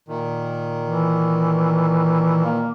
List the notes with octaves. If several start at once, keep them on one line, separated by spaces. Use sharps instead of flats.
A#2 D#3
E3
A#3